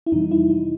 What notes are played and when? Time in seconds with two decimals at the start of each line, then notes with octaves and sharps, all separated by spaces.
0.06 E4
0.12 F2 C3 E3 G3 D#4
0.31 E4
0.50 D#4